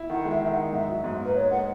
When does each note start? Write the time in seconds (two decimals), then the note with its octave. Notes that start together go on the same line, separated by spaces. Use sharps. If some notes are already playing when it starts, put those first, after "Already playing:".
Already playing: E4
0.09 D#3 F#5
0.25 G#3
0.31 E5
0.41 D#3 E5
0.51 F#5
0.57 D#4
0.72 G#2 E5
0.88 F#3
1.04 G#2
1.20 A#3
1.26 B4
1.35 D#4 C#5
1.51 G#3 F#5